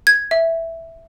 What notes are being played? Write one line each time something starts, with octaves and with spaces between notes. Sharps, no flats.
G#6
E5